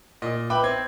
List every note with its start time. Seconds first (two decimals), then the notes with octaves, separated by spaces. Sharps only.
0.22 A#2 D#5
0.50 B4 E5 G5 B5 D6
0.63 C4 G#6